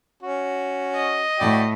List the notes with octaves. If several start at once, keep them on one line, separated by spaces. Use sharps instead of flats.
C#4 F#4
D#5
A2 F#4 D5 G5